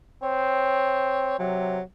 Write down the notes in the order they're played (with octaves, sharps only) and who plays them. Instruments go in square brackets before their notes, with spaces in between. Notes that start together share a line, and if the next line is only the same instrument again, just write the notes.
[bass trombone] C4 [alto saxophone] C#5
[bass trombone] C3 [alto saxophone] F#3